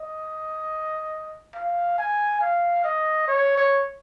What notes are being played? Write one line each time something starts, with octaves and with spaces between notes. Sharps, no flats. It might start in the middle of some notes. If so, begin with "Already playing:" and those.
Already playing: D#5
F5
G#5
F5
D#5
C#5
C#5